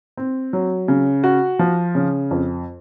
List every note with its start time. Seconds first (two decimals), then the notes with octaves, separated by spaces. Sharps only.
0.17 C4
0.53 F#3
0.88 C#3
1.24 F#4
1.59 F3
1.95 C#3
2.31 F2